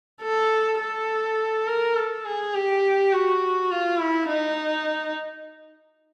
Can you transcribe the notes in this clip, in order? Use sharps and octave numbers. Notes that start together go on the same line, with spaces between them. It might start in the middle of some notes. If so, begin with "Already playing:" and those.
A4
A4
A#4
A4
G#4
G4
F#4
F4
E4
D#4